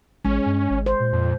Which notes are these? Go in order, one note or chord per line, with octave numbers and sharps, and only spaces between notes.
A1 G#3 C#4
G2
G#1
C5
A#2
F2